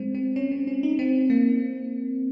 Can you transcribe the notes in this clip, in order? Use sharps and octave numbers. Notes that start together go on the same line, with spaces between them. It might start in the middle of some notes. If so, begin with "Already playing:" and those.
Already playing: G#3 C4
C4
C#4
C4
C#4
D#4
C4
A#3